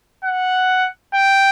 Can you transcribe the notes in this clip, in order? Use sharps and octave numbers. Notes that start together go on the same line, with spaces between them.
F#5
G5